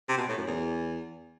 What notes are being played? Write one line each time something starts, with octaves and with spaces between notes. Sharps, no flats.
C3
B2
A2
F#2
E2